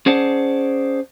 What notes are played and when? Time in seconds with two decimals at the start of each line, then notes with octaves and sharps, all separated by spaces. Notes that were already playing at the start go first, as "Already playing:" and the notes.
0.06 C#4 G#4 C5 D5 F#5 A5